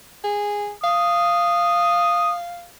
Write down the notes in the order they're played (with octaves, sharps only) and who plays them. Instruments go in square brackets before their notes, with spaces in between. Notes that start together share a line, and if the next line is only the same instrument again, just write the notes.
[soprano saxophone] G#4
[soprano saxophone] F5 [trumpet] D#6